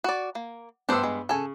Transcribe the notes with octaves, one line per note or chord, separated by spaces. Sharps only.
F#4 D5
A#3
G2 B3 D4 C5 E6
G#3
C#3 A4 G#5